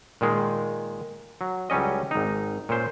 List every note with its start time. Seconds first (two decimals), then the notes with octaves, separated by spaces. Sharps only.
0.21 A#2 D#3 G#3
1.41 F#3
1.70 C#2 F#3 G3 C#4 D#5
2.11 G#1 D#4
2.69 A#2 C#4 C5